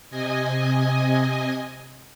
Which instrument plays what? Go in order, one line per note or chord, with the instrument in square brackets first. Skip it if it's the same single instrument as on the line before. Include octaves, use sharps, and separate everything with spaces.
[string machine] C3 D#5 G#5